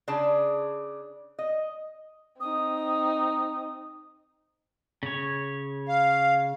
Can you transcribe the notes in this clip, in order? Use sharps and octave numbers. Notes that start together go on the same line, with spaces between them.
C#3 D4 G#4 A5
D#5
C4 D#4 D#6
C#3 C#5
F5